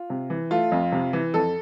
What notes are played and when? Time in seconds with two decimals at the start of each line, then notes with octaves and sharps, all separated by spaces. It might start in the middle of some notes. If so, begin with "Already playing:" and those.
Already playing: F4
0.10 C3
0.30 E3
0.51 A3 F4
0.72 F2
0.92 C3
1.13 E3
1.34 F2 A4